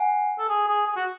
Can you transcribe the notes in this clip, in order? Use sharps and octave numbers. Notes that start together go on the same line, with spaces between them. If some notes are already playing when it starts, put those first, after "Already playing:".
Already playing: F#5 G#5
A4
G#4
G#4
G#4
F#4